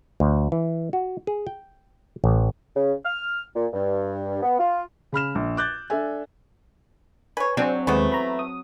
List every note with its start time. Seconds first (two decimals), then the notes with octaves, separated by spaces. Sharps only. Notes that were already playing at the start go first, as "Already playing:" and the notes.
0.20 D2
0.52 E3
0.93 F#4
1.27 G#4
1.47 G5
2.24 A1
2.75 C#3
3.05 F6
3.55 A#2
3.73 G2
4.42 B3
4.59 F4
5.12 C#3 B5 F6 E7
5.35 A#1
5.57 D6 F#6 G6 A6
5.90 D4 A4 D5 E5 G#5
7.37 B4 C#5 G#5
7.57 F#3 C4 D4 G#4
7.87 D#2 E3 G#3 A3 B3
8.12 A#5 B5
8.39 D#6